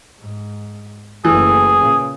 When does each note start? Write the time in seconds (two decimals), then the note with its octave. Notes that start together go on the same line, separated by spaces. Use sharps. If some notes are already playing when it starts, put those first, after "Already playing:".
0.19 G#2
1.25 F#1 E3 A3 G#4
1.80 A#2 C#3